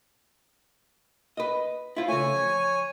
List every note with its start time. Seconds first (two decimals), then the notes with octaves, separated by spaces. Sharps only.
1.37 B4 D#5
1.96 E4 F4 C5
2.08 C#3 A3 C#5 G#5
2.36 F3